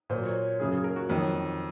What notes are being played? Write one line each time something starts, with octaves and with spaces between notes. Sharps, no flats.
A#2 F#3 C5
C#5
F#2 C#3 F#3 G#4
G#4
A#4
F#4
F2 D#3 F#3